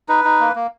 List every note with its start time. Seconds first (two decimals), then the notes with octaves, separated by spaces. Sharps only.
0.09 D#4 B4
0.25 D#4
0.40 A#3
0.55 A#3